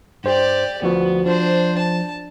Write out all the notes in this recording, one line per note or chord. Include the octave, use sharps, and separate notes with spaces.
G2 G4 C5 D5
D2 F3 B3 F#4
F3 D4 C5
A5